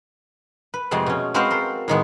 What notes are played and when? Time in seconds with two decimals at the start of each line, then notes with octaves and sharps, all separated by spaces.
0.74 B4
0.91 F2 C3 G#3 A3 C4 F#5
1.06 B2 C#4
1.34 G#3 C4 F#4 B4 C5 F5
1.51 A4 A#4 C5
1.88 A2 D#3 G#3 B3